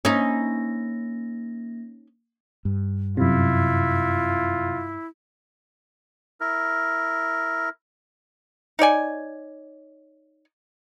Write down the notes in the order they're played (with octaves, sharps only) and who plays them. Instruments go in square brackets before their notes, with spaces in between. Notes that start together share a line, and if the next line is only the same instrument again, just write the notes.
[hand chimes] A#3 A#6 [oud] C#4 D#4
[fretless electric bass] G2
[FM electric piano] F#2 C3 [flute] E4 [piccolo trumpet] F4
[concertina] E4 A#4
[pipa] D#4 C#5 D5 G#5